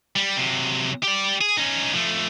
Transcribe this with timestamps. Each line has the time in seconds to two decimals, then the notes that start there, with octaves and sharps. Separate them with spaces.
0.16 G3
0.37 C3 F#3
1.03 G4 D5
1.41 G#4
1.57 C#4 D#4
1.93 F3 A3